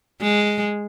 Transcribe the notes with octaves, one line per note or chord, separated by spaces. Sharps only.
G#3